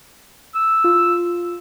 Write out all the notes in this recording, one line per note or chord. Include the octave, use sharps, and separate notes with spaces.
E6
F4